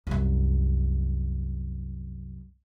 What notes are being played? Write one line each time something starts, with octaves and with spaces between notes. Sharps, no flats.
C2 F#2